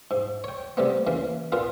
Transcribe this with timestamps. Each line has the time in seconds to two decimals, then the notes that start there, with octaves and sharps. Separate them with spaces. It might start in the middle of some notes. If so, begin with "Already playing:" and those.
0.11 G#2
0.44 C#5 G5
0.77 C3 G3 A3 B3
1.07 C#3 E3 A#3
1.52 A#2 B3 F4 A#4